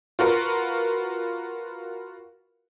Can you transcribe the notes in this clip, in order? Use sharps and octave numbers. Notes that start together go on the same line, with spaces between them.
F4 F#4 A#4 B4